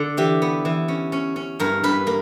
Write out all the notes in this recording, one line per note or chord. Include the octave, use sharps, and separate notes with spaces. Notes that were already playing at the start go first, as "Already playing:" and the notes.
Already playing: D3
E3 G4
B3
E3
C#4
C#4
C#4
G2 A#4
G2 B4
A#3